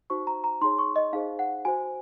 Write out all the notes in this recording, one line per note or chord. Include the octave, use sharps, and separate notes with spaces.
D#4 F#4 C5 C#6
A#5
A#5
D#4 G#4 C#5 C6
C#6
D#5
D#4 G#4 C5 F5
F#5
F#4 C5 G#5